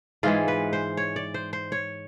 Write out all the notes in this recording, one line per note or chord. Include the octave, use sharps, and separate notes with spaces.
G#2 E3 G#3 F4
B4
C5
C#5
D5
C5
C5
C#5